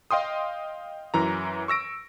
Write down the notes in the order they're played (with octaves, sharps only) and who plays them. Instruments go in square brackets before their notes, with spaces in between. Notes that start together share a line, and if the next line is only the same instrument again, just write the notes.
[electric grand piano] D#5 F5 G5 C6 D#6
F#2 E3 A#5
C#6 E6 A#6 D7